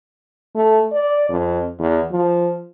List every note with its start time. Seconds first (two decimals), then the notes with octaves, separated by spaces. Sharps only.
0.55 A3
0.92 D5
1.29 F2
1.80 E2
2.12 F3